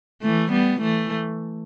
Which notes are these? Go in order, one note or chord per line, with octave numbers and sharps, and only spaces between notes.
E3 A3
G3 B3
E3 A3